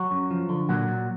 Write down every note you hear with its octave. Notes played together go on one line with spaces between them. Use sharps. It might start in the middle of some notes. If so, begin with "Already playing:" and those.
Already playing: F#3 F#4
F#2
F3
D3
A#2 F#3 F#4
A#2